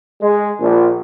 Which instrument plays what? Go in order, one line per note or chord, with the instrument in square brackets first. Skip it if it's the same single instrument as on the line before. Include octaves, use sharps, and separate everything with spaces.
[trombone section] G#3
A#1